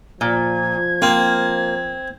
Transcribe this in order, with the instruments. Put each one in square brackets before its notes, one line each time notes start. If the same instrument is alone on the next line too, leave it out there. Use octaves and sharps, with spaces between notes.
[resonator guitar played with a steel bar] A#2 [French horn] F3 [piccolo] G#6
[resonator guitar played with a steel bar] A#3 [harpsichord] C4